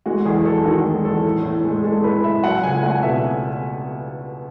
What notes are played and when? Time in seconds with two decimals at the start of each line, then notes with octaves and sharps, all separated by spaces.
0.06 G#3 F#4
0.25 E2 G#4
0.45 E2 A4
0.65 D#3 F#4
0.85 G#3
1.05 E2 A4
1.25 A2
1.44 A2
1.64 G#3
1.84 G#3 A4
2.04 A2 B4
2.24 A2 E5
2.44 F#3 F#5
2.63 C#2 G#5
2.83 A3 F#5
3.03 B2 E5